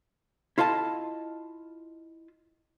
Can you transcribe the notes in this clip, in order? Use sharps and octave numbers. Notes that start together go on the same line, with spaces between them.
E4 F4 A4 D#5 A5